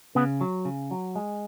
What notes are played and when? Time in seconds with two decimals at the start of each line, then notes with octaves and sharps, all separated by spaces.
0.15 C#3 B3
0.41 F#3
0.65 C#3
0.91 F#3
1.16 G#3